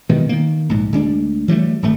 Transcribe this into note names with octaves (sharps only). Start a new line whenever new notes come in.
B2 D#3 E3 G#3
D#3 A#3
A#1 G#2
D2 G#3 D4
E3 F#3 G3 A3
D1 G#1 A3